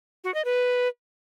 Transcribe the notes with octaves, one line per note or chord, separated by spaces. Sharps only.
F#4
D#5
B4